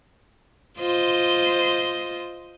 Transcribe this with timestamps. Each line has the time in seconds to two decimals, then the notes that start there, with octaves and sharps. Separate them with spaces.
0.78 F4 C5 D#5